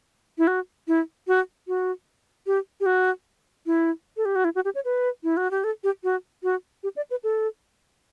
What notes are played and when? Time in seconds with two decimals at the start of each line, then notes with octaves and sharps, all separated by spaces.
0.38 E4
0.47 F#4
0.88 E4
1.27 F#4
1.68 F#4
2.47 G4
2.80 G4
2.86 F#4
3.66 E4
4.17 A4
4.25 G4
4.36 F#4
4.45 E4
4.55 F#4
4.65 G4
4.75 C#5
4.85 B4
5.24 E4
5.37 F#4
5.51 G4
5.64 A4
5.84 G4
6.04 F#4
6.43 F#4
6.83 G4
6.96 D5
7.11 B4
7.24 A4